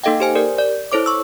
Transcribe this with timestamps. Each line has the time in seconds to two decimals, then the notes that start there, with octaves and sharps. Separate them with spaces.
0.04 A#3 D#4 A4 D#5 F5 G5
0.20 G4 C5 G#5
0.35 G4 A#4 D5
0.58 D5
0.92 E4 A4 C5 C#5 D6
1.06 C#6 E6